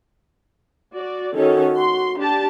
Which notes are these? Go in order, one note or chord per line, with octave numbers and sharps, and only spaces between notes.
F#4 D5
D#3 C#4 F#4 A4
C6
D4 G4 A5